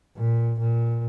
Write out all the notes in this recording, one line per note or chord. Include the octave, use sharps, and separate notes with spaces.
A#2
A#2